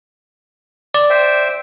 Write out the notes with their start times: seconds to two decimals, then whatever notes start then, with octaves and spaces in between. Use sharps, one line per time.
0.94 D5
1.10 C5 E5 G5